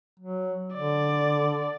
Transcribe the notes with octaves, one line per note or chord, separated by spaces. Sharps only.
F#3
D3 D5